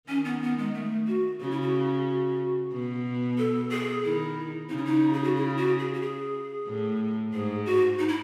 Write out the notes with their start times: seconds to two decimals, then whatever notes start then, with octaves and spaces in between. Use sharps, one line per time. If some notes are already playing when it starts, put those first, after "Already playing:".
0.08 D#3 C#4
0.25 B3
0.43 B3
0.58 G#3
0.74 A3
1.07 F#4
1.40 C#3 F#4
1.51 E4
1.61 F#4
2.72 B2
3.38 A4
3.71 G#4
4.04 D#3 E4
4.69 C#3 D#4
4.77 E4
4.85 D#4
5.13 G#4
5.24 F#4
5.36 E4
5.57 F#4
5.79 G#4
5.93 F#4
6.01 G#4
6.67 A2
7.33 G#2 G#4
7.66 F#4
7.99 D#4
8.08 E4